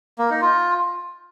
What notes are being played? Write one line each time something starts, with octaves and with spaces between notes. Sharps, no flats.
A#3
D#4
F4